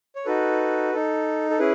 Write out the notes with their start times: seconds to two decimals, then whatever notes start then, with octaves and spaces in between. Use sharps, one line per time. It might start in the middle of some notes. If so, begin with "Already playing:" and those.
0.16 C#5
0.26 D#4 F#4 A4 B4
0.92 D#4 A4
1.50 A4
1.59 C#4 E4 G#4 B4